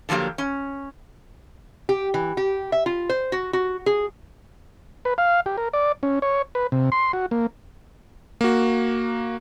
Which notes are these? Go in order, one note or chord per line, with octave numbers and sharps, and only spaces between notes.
D3 F3 F#3 A#3 G4
C#4
G4
E3
G4
E5
F4
C5
F#4
F#4
G#4
B4
F5
G4
A#4
D5
C#4
C#5
B4
C3
C6
F#4
A#3
A#3 F#4